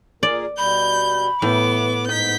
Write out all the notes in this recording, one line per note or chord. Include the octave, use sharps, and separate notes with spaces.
A#2 G#4 A#4 D5
B2 G3 B5 G6
A2 E3 B3 D6
G#2 B3 D#4 G6 B6